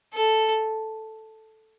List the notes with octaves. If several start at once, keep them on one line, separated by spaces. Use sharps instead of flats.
A4